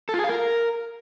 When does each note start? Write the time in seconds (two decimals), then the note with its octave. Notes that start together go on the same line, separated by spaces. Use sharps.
0.09 A4
0.14 F4
0.19 G#4
0.24 F5
0.29 A#4